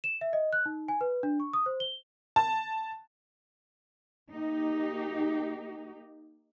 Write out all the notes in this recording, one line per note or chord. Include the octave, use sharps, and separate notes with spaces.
E7
E5
D#5
F#6
D#4
G#5
B4
D4
C#6
D#6
C5
G7
A5
A#3 D#4 G4